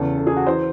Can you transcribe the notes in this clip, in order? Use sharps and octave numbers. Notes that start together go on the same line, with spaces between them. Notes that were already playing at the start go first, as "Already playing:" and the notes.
Already playing: E2 C#3 E3 A4
A4
G#4
F#4
E3 C5